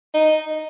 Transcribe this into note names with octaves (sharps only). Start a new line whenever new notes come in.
D#4